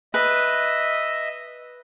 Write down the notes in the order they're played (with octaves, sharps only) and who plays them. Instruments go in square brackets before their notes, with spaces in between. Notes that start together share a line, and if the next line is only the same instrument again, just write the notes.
[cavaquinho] B4 [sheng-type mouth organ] D#5 E5